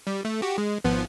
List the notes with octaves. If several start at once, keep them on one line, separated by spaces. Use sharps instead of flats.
G3
A3
F#4 G4
G#3
G#1 F3 B3